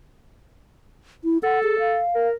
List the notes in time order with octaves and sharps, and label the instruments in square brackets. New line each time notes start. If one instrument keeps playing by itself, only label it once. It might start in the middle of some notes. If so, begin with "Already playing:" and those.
[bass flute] E4
[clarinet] A4 [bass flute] F#5
[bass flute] G#4
F5
[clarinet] A#4